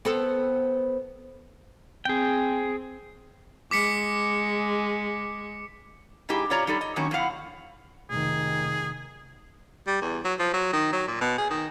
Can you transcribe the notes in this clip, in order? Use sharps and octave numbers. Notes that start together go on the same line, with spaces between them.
B3 C4 A4
C4 G#4 G5
G#3 D6 B6 C#7
G#2 D#4 E4 G4 G#4
C#3 F4 G4 C#5 D5 A#5
G3 D#4 G4 A4 D5
D#5
G2 D#3 F#3 A#3 C#4
F2 D3 E4 F5 F#5
F1 D#3 G#4
G3
E2
F#3
F3
F#3
D#3
F#3
A#2
B2
G#4
D#3